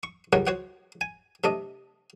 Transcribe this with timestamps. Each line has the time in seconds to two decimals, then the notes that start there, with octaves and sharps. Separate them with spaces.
0.03 C#6
0.33 C#2 C#3 G3 A#4 C#5 F#5
0.47 F#4 C5 C#5 F#5
1.01 G#5
1.44 C3 A3 D4 D#5